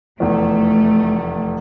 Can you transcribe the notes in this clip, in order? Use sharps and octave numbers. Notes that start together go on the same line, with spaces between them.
F1 E2 A3